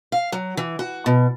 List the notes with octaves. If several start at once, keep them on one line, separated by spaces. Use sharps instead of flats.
F5
F#3
E3
F#4
B2